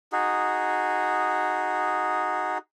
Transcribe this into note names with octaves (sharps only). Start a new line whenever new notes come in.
D#4 F#4 G#4